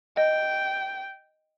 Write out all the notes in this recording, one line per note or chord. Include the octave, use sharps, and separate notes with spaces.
D#5 G5